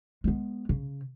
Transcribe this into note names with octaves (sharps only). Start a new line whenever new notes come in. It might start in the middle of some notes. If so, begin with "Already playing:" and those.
G#3 B3
C#3